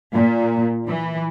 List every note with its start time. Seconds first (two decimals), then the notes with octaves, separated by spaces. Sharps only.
0.13 A#2
0.87 E3